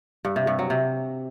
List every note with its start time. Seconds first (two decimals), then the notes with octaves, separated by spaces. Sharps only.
0.25 G2
0.36 C3
0.47 G2
0.59 F#3
0.70 C3